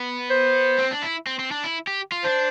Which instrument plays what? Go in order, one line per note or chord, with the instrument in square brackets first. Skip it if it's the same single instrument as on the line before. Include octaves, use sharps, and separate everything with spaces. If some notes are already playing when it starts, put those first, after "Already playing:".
Already playing: [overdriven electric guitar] B3
[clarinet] C5
[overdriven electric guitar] C4
D4
E4
C4
C4
D4
E4
G4
F4
[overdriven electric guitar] D4 [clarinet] C5